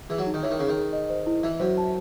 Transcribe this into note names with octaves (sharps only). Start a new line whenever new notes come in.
E3 G#4
F#3
D#4
D#3
E3 C#5
D#3
C#3 D#4
D#3
G#4
D#5
C5
E4
E3 E5
F#2 C5
A5